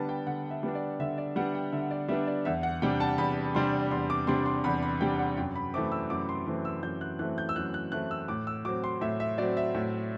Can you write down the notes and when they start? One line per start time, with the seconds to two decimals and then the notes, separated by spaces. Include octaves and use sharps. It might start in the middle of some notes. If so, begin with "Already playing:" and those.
Already playing: D3 G3 B3 D4 A5 B5
0.09 G5
0.26 D3 F#5
0.51 E5
0.63 G3 B3 D4
0.75 D5
1.00 D3 E5
1.18 D5
1.36 G3 B3 D4 F#5
1.55 G5
1.72 D3 E5
1.91 D5
2.08 G3 B3 D4 E5
2.27 D5
2.45 E2 E5
2.63 F#5
2.82 C3 G3 D4 G5
3.00 A5
3.18 E2 B5
3.55 C3 G3 D4 C6
3.91 E2 C6
4.10 D6
4.27 C3 G3 D4 C6
4.46 C6
4.64 E2 B5
4.82 B5
5.00 C3 G3 D4 G5
5.19 F#5
5.37 F#2 G5
5.56 B5
5.74 E3 A3 C4 D6
5.92 E6
6.10 F#2 D6
6.29 C6
6.46 E3 A3 C4
6.65 E6
6.83 F#2 G6
7.01 F#6
7.19 E3 A3 C4 F#6
7.38 G6
7.49 E6
7.56 F#2 F#6
7.74 F#6
7.92 E3 A3 C4 F#6
8.11 E6
8.28 A2 D6
8.47 E6
8.65 F#3 C4 D6
8.84 C6
9.01 A2 E5
9.20 E5
9.38 F#3 C4 D5
9.57 E5
9.74 A2